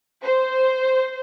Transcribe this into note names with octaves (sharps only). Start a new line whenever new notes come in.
C5